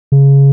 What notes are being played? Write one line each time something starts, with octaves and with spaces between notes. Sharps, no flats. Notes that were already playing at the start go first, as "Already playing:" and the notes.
C#3